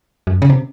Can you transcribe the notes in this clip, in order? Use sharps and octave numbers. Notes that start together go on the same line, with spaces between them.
F#2
C#3
C3